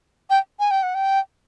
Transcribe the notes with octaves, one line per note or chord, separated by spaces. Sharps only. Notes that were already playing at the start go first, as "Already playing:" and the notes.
G5
G#5
G5
F#5
G5